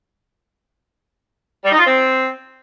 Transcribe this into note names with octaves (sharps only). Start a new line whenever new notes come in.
G3
D#4
F4
C4